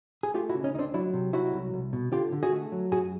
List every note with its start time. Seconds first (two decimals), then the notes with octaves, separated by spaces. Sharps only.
0.23 G#4
0.34 A3 F4 G4
0.49 E4 F#4
0.55 C#3
0.64 C#4 D#4
0.74 D2 D#4
0.79 C4 D4
0.94 F#3 D4 E4
1.14 C3
1.33 F#3 E4 F#4
1.53 C2
1.74 C2
1.93 B2
2.13 D3 F4 G4
2.32 D3
2.43 F#4 G#4
2.52 A3
2.72 F#3
2.92 F#2 F#4 G#4